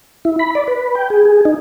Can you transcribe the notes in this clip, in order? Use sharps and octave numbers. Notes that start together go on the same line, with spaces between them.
E4
B5
D5
B4
G5
G#4
G#4
D#4